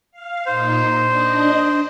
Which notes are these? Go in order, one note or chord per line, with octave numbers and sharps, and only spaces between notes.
F5
A#2 D#4 C5
D4 D#5